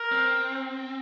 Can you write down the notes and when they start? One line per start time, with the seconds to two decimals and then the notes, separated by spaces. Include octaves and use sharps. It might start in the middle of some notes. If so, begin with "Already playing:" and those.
Already playing: A#4
0.12 C4